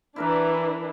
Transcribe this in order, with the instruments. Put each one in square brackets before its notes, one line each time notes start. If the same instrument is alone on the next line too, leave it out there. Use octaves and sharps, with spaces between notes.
[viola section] E3 D4 [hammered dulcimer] E4 A#4 B4